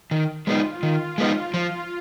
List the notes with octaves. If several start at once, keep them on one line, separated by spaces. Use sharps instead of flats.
D#3
G#3 B3 D#4 F4
D#3 F4
G#3 B3 D#4 F4
F3